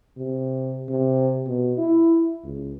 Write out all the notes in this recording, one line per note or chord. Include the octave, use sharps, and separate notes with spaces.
C3
C3
B2
E4
C#2